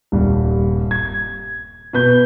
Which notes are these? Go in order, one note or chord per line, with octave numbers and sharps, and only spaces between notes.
D#1 G2
G#6
B2 B4 G6